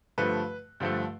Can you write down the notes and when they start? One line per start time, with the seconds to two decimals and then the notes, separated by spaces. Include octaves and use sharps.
0.18 G2 D3 F3 A3 B4
0.80 G2 D3 F3 A3